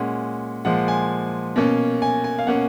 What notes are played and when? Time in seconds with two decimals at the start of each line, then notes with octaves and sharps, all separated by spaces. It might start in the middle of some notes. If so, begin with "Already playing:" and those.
Already playing: A#2 G#3 C#4 F#5
0.65 A#2 F3 G#3 F#5
0.88 G#5
1.56 B2 A#3 C#4
2.02 G#5
2.24 G#5
2.39 F5
2.47 B2 A#3 C#4 F#5